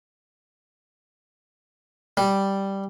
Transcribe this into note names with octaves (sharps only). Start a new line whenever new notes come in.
G3